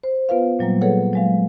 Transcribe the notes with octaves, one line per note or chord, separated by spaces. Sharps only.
C5
B3 F4 B4 F5
A#2 F#3 G3 A#3
G#4 A4 B4 C#5 F#5
F#3 G#3 F5